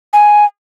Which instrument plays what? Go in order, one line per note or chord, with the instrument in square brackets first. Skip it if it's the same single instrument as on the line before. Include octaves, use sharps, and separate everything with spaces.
[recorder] G#5